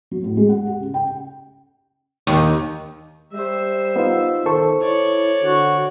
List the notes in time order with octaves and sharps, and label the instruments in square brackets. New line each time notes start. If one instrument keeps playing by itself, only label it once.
[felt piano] F#3
A2
G#3
F#5
G4
C#3
G5
[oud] D#2
[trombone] G3 [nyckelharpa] C5 E5
[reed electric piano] B3 D#4 F4
[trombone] D#3 [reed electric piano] A4 C5 C#6
[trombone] E4 [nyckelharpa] C#5 D5
[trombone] D3 [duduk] F#4